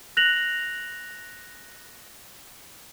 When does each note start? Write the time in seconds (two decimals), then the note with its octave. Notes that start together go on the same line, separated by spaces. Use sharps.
0.17 F#6 A#6 F7 F#7